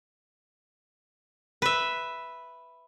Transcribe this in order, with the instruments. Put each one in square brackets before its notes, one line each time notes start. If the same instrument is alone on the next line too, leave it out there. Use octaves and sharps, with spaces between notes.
[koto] B4 E5